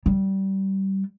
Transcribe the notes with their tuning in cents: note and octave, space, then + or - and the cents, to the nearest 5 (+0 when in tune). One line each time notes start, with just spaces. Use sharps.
G3 -25